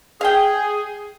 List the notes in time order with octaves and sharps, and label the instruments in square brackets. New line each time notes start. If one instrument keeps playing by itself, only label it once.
[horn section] G#4 [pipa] F5 G5